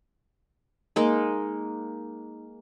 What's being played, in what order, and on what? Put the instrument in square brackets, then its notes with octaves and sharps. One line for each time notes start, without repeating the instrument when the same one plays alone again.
[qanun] G#3 A#3 D#4